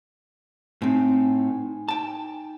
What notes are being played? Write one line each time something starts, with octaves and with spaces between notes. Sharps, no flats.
A2 C4 D#4 G#5
G5 A5